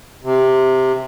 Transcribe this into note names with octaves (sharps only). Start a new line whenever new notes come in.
C3